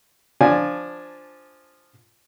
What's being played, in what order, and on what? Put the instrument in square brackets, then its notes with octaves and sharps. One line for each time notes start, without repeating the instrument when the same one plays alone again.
[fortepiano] F3 D4 G#5